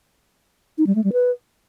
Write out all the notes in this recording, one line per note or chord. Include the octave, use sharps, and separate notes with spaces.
D#4
G3
A3
G3
B4